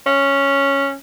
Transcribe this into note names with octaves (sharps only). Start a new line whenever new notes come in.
C#4